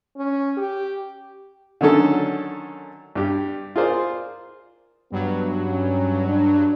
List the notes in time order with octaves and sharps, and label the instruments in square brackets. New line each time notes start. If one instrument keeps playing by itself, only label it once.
[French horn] C#4
G4
[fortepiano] D3 D#3 F#3 C#4 A4
G2 G4
F4 G#4 A#4 C5 D5
[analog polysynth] G2 F#3 [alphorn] B3
[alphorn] C#4
D4